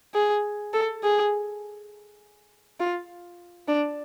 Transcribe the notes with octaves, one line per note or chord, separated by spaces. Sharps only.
G#4
A4
G#4
F4
D4